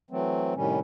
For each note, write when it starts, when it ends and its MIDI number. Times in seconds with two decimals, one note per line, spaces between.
0.10 0.54 52
0.10 0.54 54
0.10 0.54 57
0.10 0.54 60
0.55 0.80 45
0.55 0.80 48
0.55 0.80 51
0.55 0.80 55
0.55 0.80 61